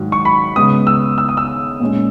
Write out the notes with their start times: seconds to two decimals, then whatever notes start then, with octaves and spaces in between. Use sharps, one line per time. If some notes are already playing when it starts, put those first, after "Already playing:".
Already playing: G#2 D#3 F#3
0.12 C#6
0.25 B5
0.56 C#3 G#3 B3 D#6
0.87 E6
1.18 E6
1.29 D#6
1.37 E6
1.80 A#2 G#3 C#4